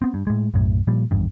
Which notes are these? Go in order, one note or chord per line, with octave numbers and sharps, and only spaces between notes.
B3 C4
G2
A2 G#3
B1 F#2 A2
A#2 F3 G3
G#1 E2 G2